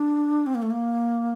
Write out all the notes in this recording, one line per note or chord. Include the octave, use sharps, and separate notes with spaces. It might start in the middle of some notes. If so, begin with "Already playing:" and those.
Already playing: D4
C4
A#3
A3
A#3